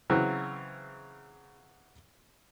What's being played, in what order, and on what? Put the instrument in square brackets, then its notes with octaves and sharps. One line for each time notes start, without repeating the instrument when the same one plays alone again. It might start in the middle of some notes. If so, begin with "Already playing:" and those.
[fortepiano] C#3 E3 F#3 C4